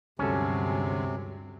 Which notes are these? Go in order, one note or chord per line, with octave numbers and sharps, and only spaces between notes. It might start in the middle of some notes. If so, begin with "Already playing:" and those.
D2 G2 C3 F#3 G#3 C#4 A4